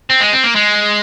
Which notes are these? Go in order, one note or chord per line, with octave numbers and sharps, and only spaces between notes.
C4
G#3
C4
A#3
G#3